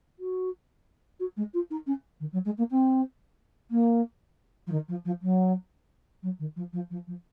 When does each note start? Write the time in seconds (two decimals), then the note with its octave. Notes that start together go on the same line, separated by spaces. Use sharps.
0.19 F#4
1.19 F#4
1.36 G#3
1.53 F4
1.70 D#4
1.86 C#4
2.20 D#3
2.32 F#3
2.45 G#3
2.57 A#3
2.70 C4
3.70 A#3
4.67 F3
4.71 D#3
4.88 F3
5.05 F3
5.22 F#3
6.22 F#3
6.39 D#3
6.56 F3
6.72 F3
6.90 F3
7.07 F3